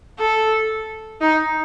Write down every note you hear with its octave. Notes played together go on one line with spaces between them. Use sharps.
A4
D#4